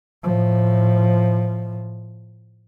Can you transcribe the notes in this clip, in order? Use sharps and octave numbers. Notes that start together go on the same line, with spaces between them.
A2 F3